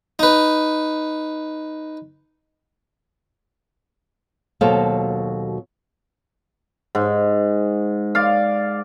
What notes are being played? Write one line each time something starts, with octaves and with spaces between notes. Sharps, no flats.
D#4 B4
D#2 B2 F#3 A4 C5 F5
G#2
D5 F5